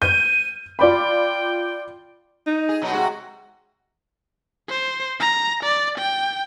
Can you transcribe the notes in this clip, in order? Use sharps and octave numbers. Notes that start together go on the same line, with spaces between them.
G6 D#7
F4 D5 G5 B5
D#4
G#4
B2 F#3 D#4
C3 G#3 F#4
C5
A#5
D5
G5